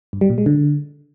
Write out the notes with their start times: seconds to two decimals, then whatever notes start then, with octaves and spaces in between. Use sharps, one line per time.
0.13 G2
0.21 G3
0.30 A#2
0.38 G#3
0.46 D3